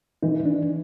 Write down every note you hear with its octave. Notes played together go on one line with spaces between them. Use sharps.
E3 D#4
D4